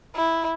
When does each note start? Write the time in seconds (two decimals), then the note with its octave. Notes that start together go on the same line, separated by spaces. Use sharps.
0.15 E4